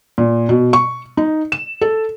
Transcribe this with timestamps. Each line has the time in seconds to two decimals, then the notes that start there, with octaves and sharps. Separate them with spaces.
0.18 A#2
0.49 B2
0.73 C#6
1.17 D#4
1.52 E7
1.81 A4